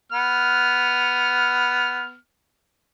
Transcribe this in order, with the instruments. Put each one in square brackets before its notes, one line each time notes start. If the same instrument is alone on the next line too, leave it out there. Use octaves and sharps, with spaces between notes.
[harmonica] B3 F6